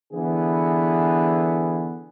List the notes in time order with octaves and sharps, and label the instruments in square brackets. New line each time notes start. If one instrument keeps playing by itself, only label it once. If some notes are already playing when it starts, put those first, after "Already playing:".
[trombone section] D3 E3 B3 G#4